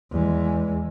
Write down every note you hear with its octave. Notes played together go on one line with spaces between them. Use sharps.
E2 G#3